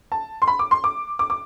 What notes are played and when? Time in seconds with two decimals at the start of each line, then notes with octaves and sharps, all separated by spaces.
0.12 A5
0.42 C6
0.48 B5
0.59 D6
0.71 C6
0.84 D6
1.19 D6
1.30 D6